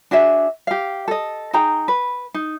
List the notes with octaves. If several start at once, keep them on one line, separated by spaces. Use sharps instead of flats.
D4 F#4 G#4 E5
G4 F5
A4 D#5
D#4 G#4 G5 A#5
B4
D#4